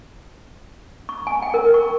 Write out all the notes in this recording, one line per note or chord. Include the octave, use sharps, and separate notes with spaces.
C#6
G#5
G5
A#4
C#6